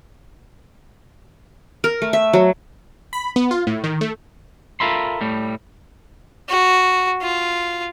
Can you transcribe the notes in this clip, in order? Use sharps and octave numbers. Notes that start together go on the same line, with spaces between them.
A#4
A3
E5
F#3
B5
B3
F4
A2
D#3
A3
F4 A4 A#4 E5 B5 C6
A2 G3 A3
F#4
F4